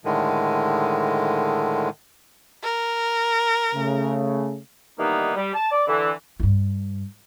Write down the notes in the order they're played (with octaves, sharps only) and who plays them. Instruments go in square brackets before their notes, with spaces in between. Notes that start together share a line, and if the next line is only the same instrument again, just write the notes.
[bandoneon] A2 D3 D#3 G#3
[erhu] A#4
[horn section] C#3 A3
[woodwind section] D#3 E3 G3 A#3 B3 D#4
G3
A5
D5
D3 E3
[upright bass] G2 F4